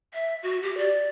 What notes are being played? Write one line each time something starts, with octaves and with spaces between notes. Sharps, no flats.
E5
F#4
G4
D5